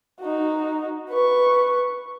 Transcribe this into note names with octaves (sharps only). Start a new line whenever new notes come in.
D#4 F#4
B4 C#6